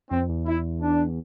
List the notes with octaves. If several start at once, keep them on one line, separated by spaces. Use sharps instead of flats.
F2 C4
E2
E4
D4